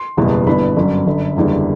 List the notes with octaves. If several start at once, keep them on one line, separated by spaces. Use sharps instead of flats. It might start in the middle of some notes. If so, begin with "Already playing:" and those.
Already playing: C6
F#1 E2 B2 G3 B3
G1 G2 E3 B3 B5
G1 F#2 F#3
G1 F#2 D3
F#1 E2 D3 G3